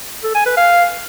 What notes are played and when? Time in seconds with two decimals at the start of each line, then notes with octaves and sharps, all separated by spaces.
0.24 A4
0.35 G#5
0.46 B4
0.57 F5